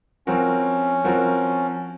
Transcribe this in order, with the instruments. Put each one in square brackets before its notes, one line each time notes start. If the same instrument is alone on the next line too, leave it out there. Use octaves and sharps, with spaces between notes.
[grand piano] F3 C4 F#4 A#4 [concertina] C#4
[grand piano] F3 C4 F#4 A#4